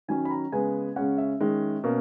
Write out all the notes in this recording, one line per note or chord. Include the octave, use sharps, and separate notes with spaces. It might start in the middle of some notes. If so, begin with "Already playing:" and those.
D#3 F#3 C#4 G#5
B5
A#5
C#3 G#3 B3 G#5
C#3 G#3 C#4 F#5
E5
D#3 G#3 C#4
B2 A#3 C#4